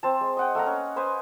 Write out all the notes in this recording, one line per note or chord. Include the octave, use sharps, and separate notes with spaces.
C4 C5 A5
G#3
D#5 F#5 G5
A3 A#3 F#5 A#5
C#4
B4 C5 D#5 G#5